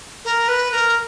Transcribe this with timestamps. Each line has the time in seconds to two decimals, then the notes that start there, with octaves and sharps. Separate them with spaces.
0.25 A#4
0.48 B4
0.72 A#4